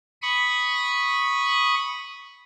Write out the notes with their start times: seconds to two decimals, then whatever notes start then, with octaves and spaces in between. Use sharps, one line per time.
0.22 B5 C#6 D#6